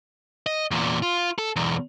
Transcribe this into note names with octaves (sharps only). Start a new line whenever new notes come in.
D#5
E2 A#2
F4
A4
B1 E2